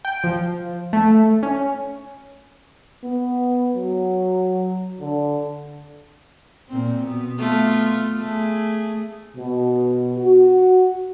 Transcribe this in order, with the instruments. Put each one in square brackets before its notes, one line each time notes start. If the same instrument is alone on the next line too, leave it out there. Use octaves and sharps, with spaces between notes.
[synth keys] G5
F3
A3
C#4
[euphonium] B3
F#3
D3
[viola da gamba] A#2 C4
B2 B3
A3 B3 F4
A3 G#4
[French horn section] B2
F#4